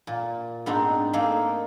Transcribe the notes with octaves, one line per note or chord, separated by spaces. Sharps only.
A#2
G#2 B3 C4 D4 D#4
A3 A#3 D#4 G#4 A4